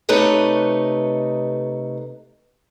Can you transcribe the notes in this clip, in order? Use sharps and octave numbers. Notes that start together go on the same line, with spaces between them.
C3 A3 D#4 B4 C#5 D#5